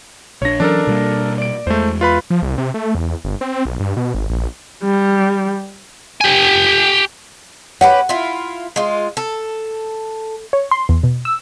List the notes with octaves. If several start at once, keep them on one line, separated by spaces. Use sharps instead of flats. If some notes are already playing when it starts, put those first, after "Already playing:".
A#1 D4 C#5 A#6
E3 F#3 C#4 D4 A4 A#4
B2 G3 A#3
D5 D7
E2 G#3 A3 C5
F4 B4 B5
F3
C2
C3
A3
E2
G1
C4
B1
G2
B2
G#1
A#1
G3
G4 G#5
C#4 G4 B4 F#5
E4 F4
G#3 F4
A4
C#5
C6
E2
B2
E6